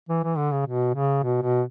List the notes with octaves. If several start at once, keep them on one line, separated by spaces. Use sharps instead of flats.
E3
E3
D3
C#3
B2
C#3
B2
B2